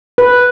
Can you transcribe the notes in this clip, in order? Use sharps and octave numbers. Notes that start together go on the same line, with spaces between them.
B4